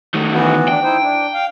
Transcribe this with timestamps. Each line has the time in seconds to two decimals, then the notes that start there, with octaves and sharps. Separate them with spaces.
0.14 D#3 A3
0.32 E3 B3 F#4
0.69 D4 G5
0.83 D#4 E4 C5
1.01 D4
1.34 F5